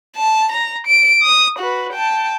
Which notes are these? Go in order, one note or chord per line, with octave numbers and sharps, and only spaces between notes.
A5
A#5
D7
D#6
F#4 B4
G5 A5